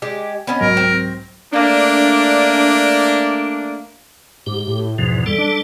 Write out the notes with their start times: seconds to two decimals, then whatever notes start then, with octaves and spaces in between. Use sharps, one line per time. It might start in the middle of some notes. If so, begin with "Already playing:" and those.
0.02 G#3 G4
0.47 B3 C#4 D#5
0.61 C2 G#2 F#3 A#4
0.77 C4
1.53 A3 A#3 D4
4.46 G#2 G4
4.67 A2
4.98 E2 G#2 B2 F3
5.26 G3 A4
5.38 D4